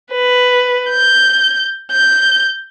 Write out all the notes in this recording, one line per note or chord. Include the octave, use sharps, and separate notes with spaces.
B4
G6
G6